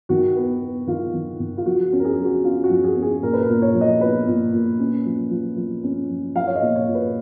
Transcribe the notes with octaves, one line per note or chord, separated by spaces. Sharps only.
D#3 F#4
B3
B3
D#3 F4
D#3
D#3
F4
F3 F#4
F#4
C#4
A#4
G#4
F3
F#4
C#4 F4
F#4
F3
G#4
C#4
G#4
A#2 A#4
B4
A#4
A#2
C#5
F3
D#5
B3 B4
A#2
A#2
C#4
F3
F3
F3
C#4
F3
F3 F5
C#5
D#5
A#2
C#5
A#2
B4